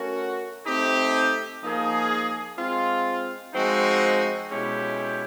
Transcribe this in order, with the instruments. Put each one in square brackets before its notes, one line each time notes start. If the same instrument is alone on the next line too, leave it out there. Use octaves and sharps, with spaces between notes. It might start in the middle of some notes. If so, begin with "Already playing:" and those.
Already playing: [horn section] A3 C#4 F#4 A#4
A3 C4 D#4 G4
F3 A#3 D#4 G#4
G#3 C4 F4
F3 G#3 C4 D#4 F#4
B2 G#3 C#4 E4 G4